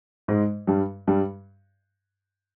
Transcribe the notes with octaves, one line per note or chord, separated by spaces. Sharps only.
G#2 G#3
G2 G3
G2 G3